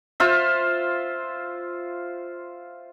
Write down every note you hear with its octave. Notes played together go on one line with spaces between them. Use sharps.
F4 C5 E5